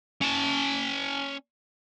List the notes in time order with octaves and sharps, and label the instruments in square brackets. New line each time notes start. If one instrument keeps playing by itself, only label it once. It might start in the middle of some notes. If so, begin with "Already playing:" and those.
[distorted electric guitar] C#4 A5